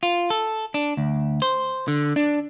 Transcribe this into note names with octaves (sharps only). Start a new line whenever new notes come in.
F4
A4
D4
D2
C5
D3
D4